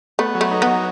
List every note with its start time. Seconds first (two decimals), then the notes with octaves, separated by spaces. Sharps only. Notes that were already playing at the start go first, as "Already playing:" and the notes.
0.19 A3 B3
0.35 F#3
0.41 A3
0.51 D#4
0.62 F#3 B3